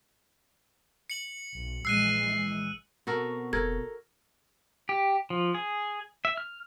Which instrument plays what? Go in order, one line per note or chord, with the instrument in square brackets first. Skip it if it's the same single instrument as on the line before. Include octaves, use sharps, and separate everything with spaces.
[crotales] C#7 F#7
[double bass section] B1
[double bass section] A#1 E3 G#3 [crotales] E6 F#6 D#7 [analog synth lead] C7
[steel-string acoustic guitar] B2 C4 [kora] F#4 A4 A#4
[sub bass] F1 [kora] A4 A#4 [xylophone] G#6
[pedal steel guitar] G4
F3
G#4
E5
F6